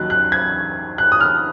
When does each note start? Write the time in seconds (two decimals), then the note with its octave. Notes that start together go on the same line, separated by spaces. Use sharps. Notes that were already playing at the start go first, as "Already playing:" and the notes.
Already playing: D#2 D#3 F#3 F#6
0.10 F#6
0.32 G#6
0.98 F#6
1.12 D#6
1.21 F6